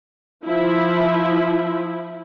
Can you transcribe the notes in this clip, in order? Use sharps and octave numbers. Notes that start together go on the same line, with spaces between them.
F3 E4